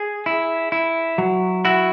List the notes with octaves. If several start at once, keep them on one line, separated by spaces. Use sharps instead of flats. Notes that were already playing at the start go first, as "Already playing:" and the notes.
Already playing: G#4
E4
E4
F#3
E4 F#4